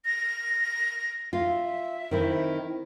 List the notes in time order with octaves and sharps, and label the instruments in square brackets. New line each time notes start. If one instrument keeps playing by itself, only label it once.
[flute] A#6
[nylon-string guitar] F4 [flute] E5
[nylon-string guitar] D#3 C4 E4